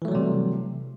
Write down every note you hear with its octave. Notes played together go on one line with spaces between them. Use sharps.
C3 E3 F#3 G3 A3